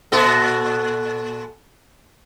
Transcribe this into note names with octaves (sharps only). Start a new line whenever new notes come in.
A#2 F#4 A4